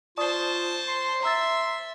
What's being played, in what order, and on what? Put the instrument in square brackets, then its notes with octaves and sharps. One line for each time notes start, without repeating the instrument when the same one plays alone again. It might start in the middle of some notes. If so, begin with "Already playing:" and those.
[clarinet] F4 [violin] C5 A5 [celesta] D5 C#6 D#6
[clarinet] C6
[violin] E5 [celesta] A#5 E6 A6